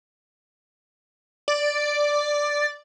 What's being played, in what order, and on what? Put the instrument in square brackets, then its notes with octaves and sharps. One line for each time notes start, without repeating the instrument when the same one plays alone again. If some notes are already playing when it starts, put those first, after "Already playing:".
[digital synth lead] D5